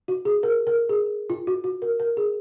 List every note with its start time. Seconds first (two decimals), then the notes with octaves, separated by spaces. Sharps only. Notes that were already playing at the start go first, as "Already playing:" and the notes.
0.08 F#4
0.25 G#4
0.43 A#4
0.67 A#4
0.89 G#4
1.30 F4
1.47 F#4
1.64 F#4
1.82 A#4
2.00 A#4
2.17 G#4